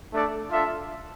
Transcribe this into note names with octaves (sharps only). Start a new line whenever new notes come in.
A3 D4 A4 D5
D4 F4 A4 E5